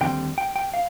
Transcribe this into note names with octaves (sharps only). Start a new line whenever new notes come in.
D#2 D3 G3 C4 G5
G5
G5
F5